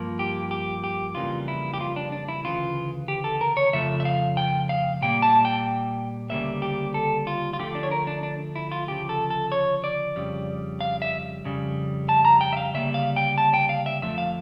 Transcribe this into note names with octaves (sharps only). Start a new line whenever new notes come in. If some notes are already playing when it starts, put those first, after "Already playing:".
Already playing: G2 F3 A#3
G4
G4
G4
F2 C#3 E3 G3 A#3 F4
E4
G4
F4
D4
D4
E4
D2 C#3 E3 F4
G4
A4
A#4
C#5
F2 C#3 F3 A3 E5
E5
F5
G5
F5
A#2 G3 A#3 G5
A5
G5
D2 C#3 G3 A#3 E5
G4
A4
F4
F4
D2 D3 F3 A3 G4
D4
C#5
A#4
D4
D4
E4
F4
D2 C#3 F3 G4
A4
A4
C#5
D5
F2 C#3 G3
F5
E5
F2 C#3 G3
A5
A#5
G5
E5
F5
D2 C#3 G3 A#3 E5
F5
G5
A5
G5
F5
E5
F2 D3 F3 A3 E5
F5